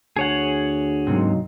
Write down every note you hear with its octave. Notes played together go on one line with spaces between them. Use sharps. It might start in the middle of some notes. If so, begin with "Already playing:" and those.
D2 G#4 C#5 F#5
G#2 C3 F#3 A#3 D#4